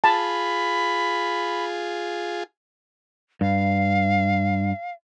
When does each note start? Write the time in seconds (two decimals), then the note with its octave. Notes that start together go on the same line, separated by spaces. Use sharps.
0.04 F4 G#4 A5 B5
3.41 G2 F5